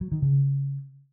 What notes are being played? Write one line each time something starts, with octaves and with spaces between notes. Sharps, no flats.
F#3
D#3
C#3